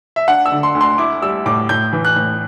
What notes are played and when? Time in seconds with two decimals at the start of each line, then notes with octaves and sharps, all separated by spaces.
0.16 E5
0.28 D4 F#5
0.46 E6
0.52 D3
0.63 C6
0.75 D2
0.81 C6
0.98 E4 D6
1.22 G3 E6
1.46 A2 D6
1.69 A2 G6
1.93 E3
2.05 F#6
2.16 A2